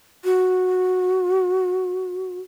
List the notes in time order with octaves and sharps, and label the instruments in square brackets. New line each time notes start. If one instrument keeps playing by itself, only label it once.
[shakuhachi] F#4